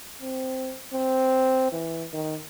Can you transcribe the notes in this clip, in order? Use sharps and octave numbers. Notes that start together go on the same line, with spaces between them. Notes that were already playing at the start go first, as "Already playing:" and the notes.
C4
C4
E3
D#3